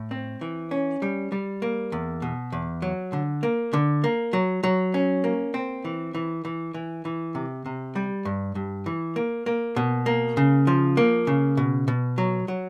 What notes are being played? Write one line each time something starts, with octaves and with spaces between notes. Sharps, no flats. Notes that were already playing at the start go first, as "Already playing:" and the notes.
Already playing: A2
C4
E3
C#4
G3
G3
A#3
E2
B2
E2
F#3
D3
A#3
D3
A#3
F#3
F#3
C#4
A#3
C4
E3
E3
E3
E3
E3
C3
C3
G3
G2
G2
E3
A#3
A#3
B2
A#3
C#3
F3
A#3
C#3
B2
B2
F#3
F#3